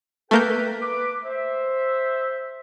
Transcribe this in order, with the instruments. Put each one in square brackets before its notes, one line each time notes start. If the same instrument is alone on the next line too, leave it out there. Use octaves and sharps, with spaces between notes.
[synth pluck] A3 A#3 G6 [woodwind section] A4 B4 G5
[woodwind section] B4 D6
C5 E5